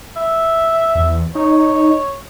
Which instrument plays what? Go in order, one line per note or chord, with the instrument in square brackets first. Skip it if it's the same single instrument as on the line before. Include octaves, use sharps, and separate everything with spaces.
[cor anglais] E5
[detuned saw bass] E2
[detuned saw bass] D#4 [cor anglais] C#5